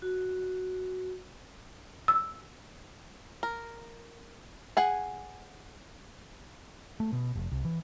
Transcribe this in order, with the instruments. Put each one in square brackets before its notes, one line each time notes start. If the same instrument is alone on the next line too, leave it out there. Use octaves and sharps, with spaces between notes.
[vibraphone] F#4
[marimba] E6
[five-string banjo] A#4
G#4 F#5 G#5
[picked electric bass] A3
B2
F1
C2
E3